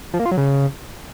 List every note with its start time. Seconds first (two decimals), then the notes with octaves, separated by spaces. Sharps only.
0.14 F3
0.20 A#3
0.26 F4
0.31 F#3
0.37 C#3